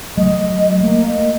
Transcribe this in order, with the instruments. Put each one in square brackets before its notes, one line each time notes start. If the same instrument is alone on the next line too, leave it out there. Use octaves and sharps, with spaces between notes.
[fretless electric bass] F#3 A3 [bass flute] D#5
[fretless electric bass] A3 [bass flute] A#3
[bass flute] D#5